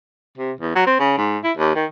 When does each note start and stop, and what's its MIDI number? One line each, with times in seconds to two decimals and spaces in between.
0.38 0.52 48
0.61 0.74 40
0.75 0.83 54
0.87 0.96 60
0.99 1.13 49
1.18 1.38 44
1.44 1.52 64
1.58 1.73 39
1.75 1.85 51